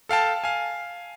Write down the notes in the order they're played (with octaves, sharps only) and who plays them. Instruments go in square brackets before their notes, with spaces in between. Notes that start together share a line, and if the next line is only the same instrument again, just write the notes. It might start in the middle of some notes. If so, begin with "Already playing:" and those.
[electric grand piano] A4 F5 G5 A5
F5 G#5